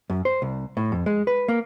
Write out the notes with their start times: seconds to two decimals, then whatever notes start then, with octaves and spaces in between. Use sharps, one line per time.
0.10 F#2
0.25 C5
0.42 C2
0.77 A2
0.92 F2
1.06 G#3
1.27 B4
1.48 A#3